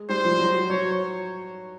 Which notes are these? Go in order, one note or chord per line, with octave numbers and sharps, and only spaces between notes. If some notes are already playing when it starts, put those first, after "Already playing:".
Already playing: G#3
G3 C5
F3
F#3
F#3 C#5